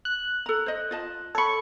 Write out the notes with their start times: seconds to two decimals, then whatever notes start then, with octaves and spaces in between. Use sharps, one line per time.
0.05 F#6
0.46 A4 A#5
0.66 C5 D#5
0.91 F4 D#5 A5
1.35 A4 C#5 B5 C#6